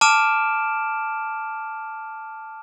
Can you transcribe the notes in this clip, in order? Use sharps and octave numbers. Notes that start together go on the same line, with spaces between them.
A5 D6 F6 D7 E7